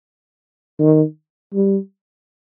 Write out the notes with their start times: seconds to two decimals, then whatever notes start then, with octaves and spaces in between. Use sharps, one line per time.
0.80 D#3
1.54 G3